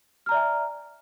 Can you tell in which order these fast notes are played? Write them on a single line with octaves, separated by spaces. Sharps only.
F6 A#5 D5 E5 G#5